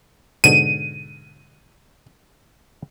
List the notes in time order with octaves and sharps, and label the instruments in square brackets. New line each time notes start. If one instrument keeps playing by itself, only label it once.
[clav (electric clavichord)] G#2 B2 D3 [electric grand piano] D#7